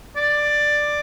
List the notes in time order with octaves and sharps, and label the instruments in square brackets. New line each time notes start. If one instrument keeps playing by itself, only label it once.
[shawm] D5